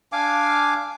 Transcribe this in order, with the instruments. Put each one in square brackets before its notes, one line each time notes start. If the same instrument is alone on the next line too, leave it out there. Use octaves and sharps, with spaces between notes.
[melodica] D4 F5 G#5 D6